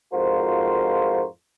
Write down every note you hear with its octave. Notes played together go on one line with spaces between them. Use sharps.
F2 G#2 F4 F#4 A#4 C5